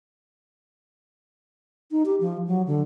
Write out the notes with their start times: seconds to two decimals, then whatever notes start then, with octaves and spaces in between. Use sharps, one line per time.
1.91 D#4
2.06 G4
2.21 F3
2.47 F#3
2.67 D3